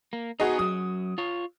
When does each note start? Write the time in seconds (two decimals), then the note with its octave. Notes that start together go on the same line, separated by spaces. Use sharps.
0.13 A#3
0.40 B3 D#4 F#4 G#4 D#5
0.59 F#2 F#3 D#6
1.18 F4 C#5